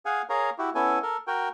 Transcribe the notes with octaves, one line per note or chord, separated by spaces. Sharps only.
G#4 F5 F#5 G#5
G#4 A#4 C#5 F5 A#5
E4 F#4 G4
B3 C#4 E4 A4 G#5
A4 A#4
F#4 A#4 G5